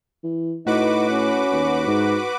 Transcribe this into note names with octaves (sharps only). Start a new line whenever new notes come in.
E3
A2 D#4 F#4 B4 D6
C#4
D#2
G#2